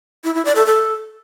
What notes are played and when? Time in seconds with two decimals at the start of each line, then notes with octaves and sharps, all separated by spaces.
0.24 E4
0.35 E4
0.45 D5
0.56 A4
0.66 A4